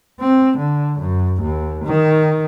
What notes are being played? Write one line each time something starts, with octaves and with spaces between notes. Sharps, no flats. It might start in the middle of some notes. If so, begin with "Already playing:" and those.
C4
D3
F#2
D#2
D#3